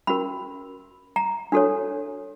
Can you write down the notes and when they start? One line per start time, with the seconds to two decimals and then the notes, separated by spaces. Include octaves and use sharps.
0.07 C#4 F#4 A#4 B5
1.16 A#5
1.52 D4 F#4 A4 C#5